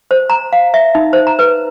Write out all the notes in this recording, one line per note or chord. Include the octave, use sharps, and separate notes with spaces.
C5
A#5
F5
E5
D#4
C5
A#5
B4